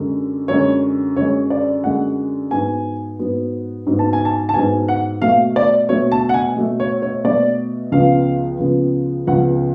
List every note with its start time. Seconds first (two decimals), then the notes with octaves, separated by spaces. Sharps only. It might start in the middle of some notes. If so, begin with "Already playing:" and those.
Already playing: F#2 D3 G#3
0.48 F#2 D3 G#3 C#5
1.16 F#2 D3 G#3 C#5
1.50 D5
1.84 F#2 D3 G#3 F#5
2.51 G#2 F#3 B3 G#5
3.19 G#2 F#3 B3
3.87 G#2 F#3 B3
3.99 A5
4.13 G#5
4.25 A5
4.49 A5
4.54 G#2 F#3 B3 G#5
4.88 F#5
5.22 B2 F#3 A3 F5
5.56 D5
5.89 B2 F#3 A3 C#5
6.12 A5
6.29 F#5
6.34 G#5
6.57 B2 F#3 A3
6.80 C#5
7.02 C#5
7.24 B2 F#3 A3 D5
7.92 C#2 C#3 F3 B3 F5
8.60 C#2 C#3 F3 B3
9.27 C#2 C#3 F3 B3 F#5